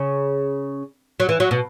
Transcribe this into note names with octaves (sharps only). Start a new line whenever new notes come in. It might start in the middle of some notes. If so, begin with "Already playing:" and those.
Already playing: C#3
F#3
E3
F#3
B2